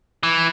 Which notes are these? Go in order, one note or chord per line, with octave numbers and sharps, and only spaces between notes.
E3